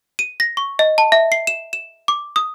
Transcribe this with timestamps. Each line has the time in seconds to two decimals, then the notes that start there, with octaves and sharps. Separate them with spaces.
0.19 D#7
0.40 A#6
0.57 C#6
0.79 D#5
0.98 A5
1.12 E5
1.32 C7
1.47 E7
1.73 E7
2.08 D6
2.36 D#6